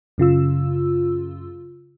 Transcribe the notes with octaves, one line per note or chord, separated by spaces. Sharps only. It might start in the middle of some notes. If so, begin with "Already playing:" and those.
F#2 C#3 F4 E6